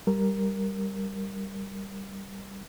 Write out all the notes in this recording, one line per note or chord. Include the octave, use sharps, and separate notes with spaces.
G3 A#4